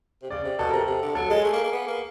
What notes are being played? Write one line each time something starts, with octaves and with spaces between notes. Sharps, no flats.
C3
C#3 D5
C3
B2 A4
C3 A#4
A4
C3
D3
F#3 A4
G#3 G#4
A3
A#3
A#3
B3
A#3